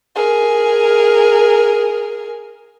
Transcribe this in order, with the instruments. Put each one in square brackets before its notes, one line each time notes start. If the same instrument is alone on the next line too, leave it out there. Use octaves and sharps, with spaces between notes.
[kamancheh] G#4 A#4